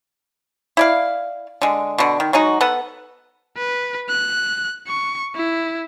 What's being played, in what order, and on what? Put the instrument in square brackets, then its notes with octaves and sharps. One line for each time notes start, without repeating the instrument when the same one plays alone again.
[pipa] E4 D5 F5
D3 G#3
B2 D3
D#3
F#3 G#3 D#4 F#4
B3 A4 B4 F#5
[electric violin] B4
F#6
C#6
E4